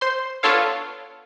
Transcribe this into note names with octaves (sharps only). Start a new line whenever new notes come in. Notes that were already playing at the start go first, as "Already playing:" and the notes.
C5 C6
B3 D4 F4 A4 C#5 F5